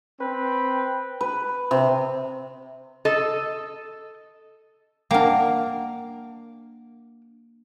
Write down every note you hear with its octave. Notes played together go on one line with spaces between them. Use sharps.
C4 B4 G5
B4
C3 C6
A4 D#5
A#3 D4 A#4 F#5 G5